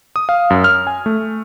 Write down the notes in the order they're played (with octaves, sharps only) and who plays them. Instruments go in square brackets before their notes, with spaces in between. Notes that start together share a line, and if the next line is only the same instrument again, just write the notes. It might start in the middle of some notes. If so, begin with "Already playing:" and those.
[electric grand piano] D#6
F5
F#2
F6
G#5
A3